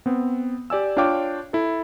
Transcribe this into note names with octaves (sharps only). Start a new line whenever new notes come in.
B3 C4
G4 D5 G#5 E6
D4 F4 C#5 F5 G5 D6
E4 A4